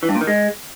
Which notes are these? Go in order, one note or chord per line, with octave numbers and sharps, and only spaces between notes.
E3
G2
A#2
D#3
G#3